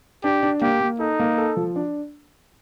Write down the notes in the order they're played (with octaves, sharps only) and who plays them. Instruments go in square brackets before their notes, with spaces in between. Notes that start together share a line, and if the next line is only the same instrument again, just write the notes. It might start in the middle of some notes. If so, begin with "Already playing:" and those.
[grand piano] D4 [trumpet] G4
[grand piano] D4
[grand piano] A#3 [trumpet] G4
[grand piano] A#3
[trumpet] D#4 [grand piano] A4
[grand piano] A#3
A4
F3
D4